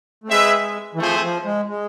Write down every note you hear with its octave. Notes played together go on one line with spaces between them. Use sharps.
A3
G#3 C4 G#4 B4 E5
E3
F3 A3 C4 G#4 C5 E5
F3
G#3
G#3